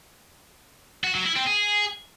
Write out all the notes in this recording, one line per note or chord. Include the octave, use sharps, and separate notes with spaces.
F#4
F#3
E4
C4
G#4